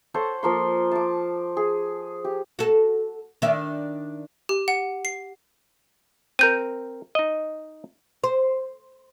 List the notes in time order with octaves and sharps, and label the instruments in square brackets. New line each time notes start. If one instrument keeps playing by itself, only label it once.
[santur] A4 C5 C#5 F#5
F3 A#3 C6
A5 D6
G#4
G4
[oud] F#4 A4
D#3 D4 E5
[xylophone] G4
F#5
C7
[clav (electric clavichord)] C4 A#4 [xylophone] G6 D#7
[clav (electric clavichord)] D#4 D#5
[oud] C5